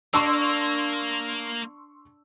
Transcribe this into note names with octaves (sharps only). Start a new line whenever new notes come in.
A#3 D4 C6 C#6 E6